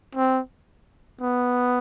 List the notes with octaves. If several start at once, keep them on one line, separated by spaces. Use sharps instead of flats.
C4
B3